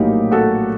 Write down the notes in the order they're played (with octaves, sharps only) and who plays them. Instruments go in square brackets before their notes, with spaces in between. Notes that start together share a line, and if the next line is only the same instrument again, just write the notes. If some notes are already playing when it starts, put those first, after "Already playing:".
Already playing: [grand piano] A#1 A2 F#3 A#3 [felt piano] D#4 G4
[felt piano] F#4 A4